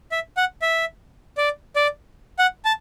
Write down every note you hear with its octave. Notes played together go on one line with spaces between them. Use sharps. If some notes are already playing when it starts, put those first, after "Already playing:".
E5
F#5
E5
D5
D5
F#5
A5